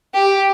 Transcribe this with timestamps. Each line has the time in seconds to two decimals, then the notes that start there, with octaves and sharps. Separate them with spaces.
0.14 G4